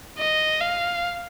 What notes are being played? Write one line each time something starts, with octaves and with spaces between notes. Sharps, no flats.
D#5
F5